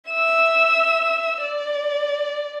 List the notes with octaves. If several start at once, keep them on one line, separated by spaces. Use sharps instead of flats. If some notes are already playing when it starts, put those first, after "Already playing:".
E5 E6
D5